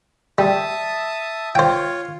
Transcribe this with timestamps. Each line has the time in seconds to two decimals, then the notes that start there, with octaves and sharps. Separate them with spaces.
0.38 G3 E5 A5 D#6
1.55 F4 C5 C#5 G5